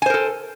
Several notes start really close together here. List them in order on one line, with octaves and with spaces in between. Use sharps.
G#5 C5 A#4 A4